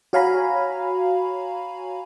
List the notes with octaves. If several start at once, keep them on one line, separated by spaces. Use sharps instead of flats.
F#4 C#5 F5 G#5 A#5 B5